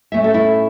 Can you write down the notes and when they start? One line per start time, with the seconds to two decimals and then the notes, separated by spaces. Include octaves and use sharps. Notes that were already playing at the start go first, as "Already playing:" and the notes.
0.12 A2 A3 C#4 E5
0.24 A4
0.34 E4